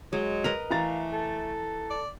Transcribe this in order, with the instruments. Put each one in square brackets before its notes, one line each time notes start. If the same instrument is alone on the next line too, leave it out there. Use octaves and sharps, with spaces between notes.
[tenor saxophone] F#3 [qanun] G#3
[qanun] A#4 B4 D#5 [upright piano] F7
[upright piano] E3 A#5 A6 [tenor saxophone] A3 [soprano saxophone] F5
[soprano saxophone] A4
[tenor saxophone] D5